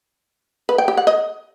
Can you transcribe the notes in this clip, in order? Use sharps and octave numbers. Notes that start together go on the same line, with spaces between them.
B4
G5
G4
F#5
D#5